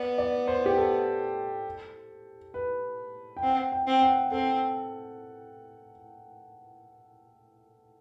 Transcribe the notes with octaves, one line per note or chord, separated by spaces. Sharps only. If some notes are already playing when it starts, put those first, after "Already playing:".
Already playing: B3 D5
D5
C5
G4
A4
B4
G5
C4 F#5
G5
C4
F#5
C4 A4